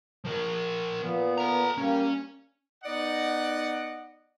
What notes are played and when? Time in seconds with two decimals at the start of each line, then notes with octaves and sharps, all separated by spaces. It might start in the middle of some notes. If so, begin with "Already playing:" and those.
0.25 F3 A#4
0.99 A#2 B3
1.38 A4 A#5
1.78 G3 A#3 C#4
2.84 B3 D#4 D5 D#5 F#5